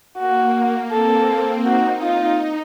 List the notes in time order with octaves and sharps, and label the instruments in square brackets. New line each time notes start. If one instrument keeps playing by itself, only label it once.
[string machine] A#3 [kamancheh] F#4
[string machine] C4 [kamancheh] A4
[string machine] D#4 [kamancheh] F#4
[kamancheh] F4